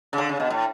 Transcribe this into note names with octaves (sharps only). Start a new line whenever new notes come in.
C#3
D3
C#3
B2
A2